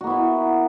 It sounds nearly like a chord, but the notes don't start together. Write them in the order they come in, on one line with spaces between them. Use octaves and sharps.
F#4 A#3 B3 E4